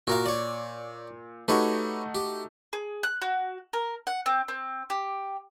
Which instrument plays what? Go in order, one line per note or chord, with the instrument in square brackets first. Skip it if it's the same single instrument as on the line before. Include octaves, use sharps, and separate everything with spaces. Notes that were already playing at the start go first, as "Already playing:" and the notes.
[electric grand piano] A#2 [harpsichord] F#4 A#4 F5
[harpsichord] C#5 D5
[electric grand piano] A3 D#4 F#4 [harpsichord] G4 B4 C#5
[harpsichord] G4
[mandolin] G#4
F#6
F#4
A#4
F#5
C4
C4
G4